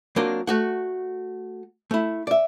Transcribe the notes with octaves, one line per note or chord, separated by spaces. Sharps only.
F#3 A#3 C4 D4 F4 A#4
A3 F#4 F#5
A3 E4
D5 E5